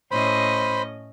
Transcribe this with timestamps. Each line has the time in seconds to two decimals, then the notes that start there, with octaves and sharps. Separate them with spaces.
0.11 A2 C#4 C5 D#5 B5